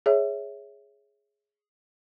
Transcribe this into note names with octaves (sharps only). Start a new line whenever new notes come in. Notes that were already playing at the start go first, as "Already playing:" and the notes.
G#4 C#5 E5